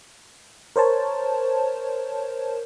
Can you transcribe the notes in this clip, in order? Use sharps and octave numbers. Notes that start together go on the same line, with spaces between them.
A#4 C5 C#5 A5